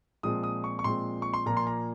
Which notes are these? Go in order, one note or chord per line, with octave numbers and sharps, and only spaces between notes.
A#2 F3 G#3 C4 D#6
D#6
C#6
C#6
A#2 F3 G#3 C4 C6
C#6
C6
A#2 F3 A#3 A#5
C6
A#5